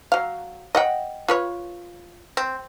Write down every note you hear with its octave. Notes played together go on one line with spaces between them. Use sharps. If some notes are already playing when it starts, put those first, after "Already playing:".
F#3 F5
D#5 F#5 G5
F4 B4 C#5
C4